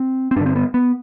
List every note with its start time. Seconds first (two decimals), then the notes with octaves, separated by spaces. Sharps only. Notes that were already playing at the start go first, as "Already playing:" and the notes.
Already playing: C4
0.31 C4
0.36 G2 D4
0.41 D3
0.46 C4
0.56 B3
0.74 B3